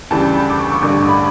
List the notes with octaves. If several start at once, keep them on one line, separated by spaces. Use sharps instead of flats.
D2 C#3 E3 G3 A5
B5
D6
C#6
C#6
A1 G2 D3 D6
B5